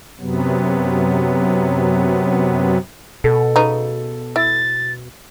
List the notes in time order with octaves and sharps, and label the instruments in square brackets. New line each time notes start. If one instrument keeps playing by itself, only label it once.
[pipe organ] F#2 C3 F#3 B3
[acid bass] B2 [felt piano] A4
[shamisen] C#3 B3 D#4
[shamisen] E4 E5 [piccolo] A6